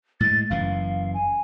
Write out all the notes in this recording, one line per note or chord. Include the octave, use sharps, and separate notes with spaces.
A2 G#3 A6
F#1 F#2 E3 F5
G#5